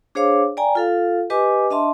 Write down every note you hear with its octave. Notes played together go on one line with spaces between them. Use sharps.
D4 G#4 C5 C#5 F5 D6
D5 G5 G#5 A#5
F4 A4 F5
G4 B4 D#5 G#5 D6
D4 D#5 E5 A5 C6